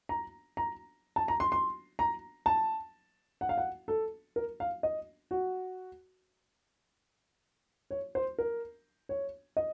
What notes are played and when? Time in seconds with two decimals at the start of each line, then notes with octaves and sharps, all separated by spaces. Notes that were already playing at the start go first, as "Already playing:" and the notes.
0.09 A#5
0.57 A#5
1.16 A5
1.28 A#5
1.40 C6
1.52 C6
1.99 A#5
2.46 A5
3.41 F#5
3.49 F5
3.58 F#5
3.88 A4
4.36 A#4
4.60 F5
4.83 D#5
5.31 F#4
7.91 C#5
8.15 C5
8.38 A#4
9.09 C#5
9.57 D#5